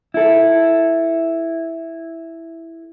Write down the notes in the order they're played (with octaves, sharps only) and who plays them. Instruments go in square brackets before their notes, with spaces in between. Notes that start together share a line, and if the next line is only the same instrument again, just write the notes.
[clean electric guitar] E4 A4